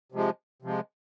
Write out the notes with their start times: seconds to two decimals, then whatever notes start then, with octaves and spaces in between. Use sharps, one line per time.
0.12 C3 F3 G#3
0.62 C3 F3 G#3